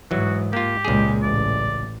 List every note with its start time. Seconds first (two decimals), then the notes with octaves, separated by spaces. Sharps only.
0.11 G#2 E3 F#3 F#4
0.53 A#3 F4 G4
0.85 C#2 A#2 G#3 G#4
1.23 A1 D5